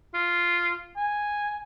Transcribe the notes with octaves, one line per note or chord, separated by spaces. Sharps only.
F4
G#5